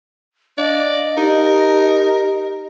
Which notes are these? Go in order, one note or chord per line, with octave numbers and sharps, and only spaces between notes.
D4 D5 D#5 F5
D#4 G4 A#4